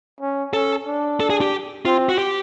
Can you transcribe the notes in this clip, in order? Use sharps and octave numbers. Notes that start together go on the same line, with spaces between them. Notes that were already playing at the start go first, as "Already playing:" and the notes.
C#4
C#4 A4
D4
A4
G#4
G4
C4 F4
F#4
G4